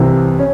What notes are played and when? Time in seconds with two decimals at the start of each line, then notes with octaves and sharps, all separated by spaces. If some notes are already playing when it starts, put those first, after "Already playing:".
Already playing: C2 C3 E3
0.39 C#4